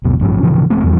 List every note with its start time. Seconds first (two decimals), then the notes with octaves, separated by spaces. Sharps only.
0.04 D1 B1 F2 B2
0.19 A1 G2 F3 C#4
0.43 A2 C#3 E3 F3
0.70 F1 G#3 A3 C4
0.84 E2 E3 F3 G3